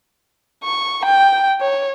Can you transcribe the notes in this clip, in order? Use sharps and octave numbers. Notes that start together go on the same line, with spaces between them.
C#6
G5
C#5